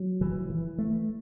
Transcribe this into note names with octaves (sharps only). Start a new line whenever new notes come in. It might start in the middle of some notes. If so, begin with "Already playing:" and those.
Already playing: F#3
E3
E3
A3